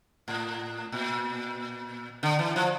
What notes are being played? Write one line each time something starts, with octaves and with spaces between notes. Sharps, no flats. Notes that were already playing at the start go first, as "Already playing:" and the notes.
A2
A#2
D3
E3
F3